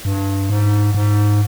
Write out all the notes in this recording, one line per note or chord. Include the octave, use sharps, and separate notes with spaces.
G2
G#2
G#2